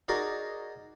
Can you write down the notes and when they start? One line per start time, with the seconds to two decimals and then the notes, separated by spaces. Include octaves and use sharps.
0.08 D#4 F#4 G#4 A#4 D5 D#5